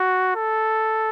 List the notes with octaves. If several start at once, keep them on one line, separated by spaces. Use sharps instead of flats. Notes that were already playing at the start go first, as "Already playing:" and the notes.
Already playing: F#4
A4